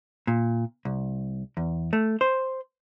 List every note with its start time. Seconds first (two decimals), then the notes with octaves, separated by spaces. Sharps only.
0.27 A#2
0.85 C2
1.57 E2
1.93 A3
2.21 C5